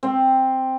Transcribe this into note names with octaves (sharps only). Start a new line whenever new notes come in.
C4